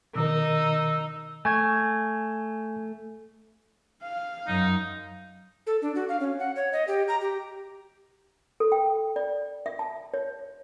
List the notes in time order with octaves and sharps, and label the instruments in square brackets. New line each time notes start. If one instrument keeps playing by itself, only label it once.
[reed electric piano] B2 D#3 A#4 [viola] D#4 [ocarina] E6
[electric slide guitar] A3 [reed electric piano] G#5 C#6 G#6
[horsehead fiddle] F5
[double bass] F#2 F#3 [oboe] D#4
[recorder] A4
D4
F#4
F5
C#4
F#5
C#5
D#5
G4
A#5
G4
[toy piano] A4
G5
D5
E5
A5
C#5